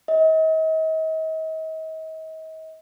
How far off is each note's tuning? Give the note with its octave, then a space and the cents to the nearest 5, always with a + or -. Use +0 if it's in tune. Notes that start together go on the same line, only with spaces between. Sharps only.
D#5 +40